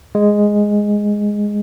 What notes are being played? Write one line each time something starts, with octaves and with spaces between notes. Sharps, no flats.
G#3